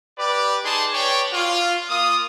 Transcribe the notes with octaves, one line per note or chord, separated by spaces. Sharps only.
G4 B4 D5
D#4 G#4 A5 C6
B4 C#5 D5 G5
F4
A#3 F4 D#6